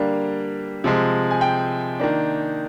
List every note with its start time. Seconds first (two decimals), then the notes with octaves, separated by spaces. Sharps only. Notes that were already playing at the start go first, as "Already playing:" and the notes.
Already playing: D3 G3 A#3 D4 F5
0.84 C3 F3 G#3
1.31 G#5
1.41 G5
2.00 D#3 A#3 D4